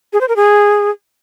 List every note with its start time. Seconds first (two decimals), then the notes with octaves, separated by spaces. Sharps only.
0.13 G#4
0.21 C5
0.28 A#4
0.36 G#4